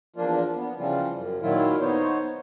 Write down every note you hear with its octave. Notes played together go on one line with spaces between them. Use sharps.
E2 F3 A#3 D4 F4
B3
C#3 E3 F3 G3 F4
F#2
A#2 D#3 F#3 E4 F4
B3 D#4 C5 C#5